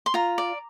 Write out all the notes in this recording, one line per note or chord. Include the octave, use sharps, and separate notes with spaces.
C6
F4 A#5
D5